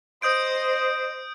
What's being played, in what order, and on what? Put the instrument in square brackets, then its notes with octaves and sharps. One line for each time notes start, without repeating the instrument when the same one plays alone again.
[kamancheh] C5 D#5 [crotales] D#6 G6 D7